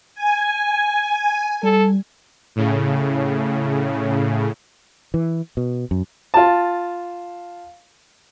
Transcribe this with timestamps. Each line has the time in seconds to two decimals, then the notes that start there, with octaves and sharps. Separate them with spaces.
0.15 G#5
1.63 G3 A4
2.56 A2 C#3
5.14 E3
5.57 B2
5.91 F#2
6.34 F4 A5